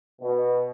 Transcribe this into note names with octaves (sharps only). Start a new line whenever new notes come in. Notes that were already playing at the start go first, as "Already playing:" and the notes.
B2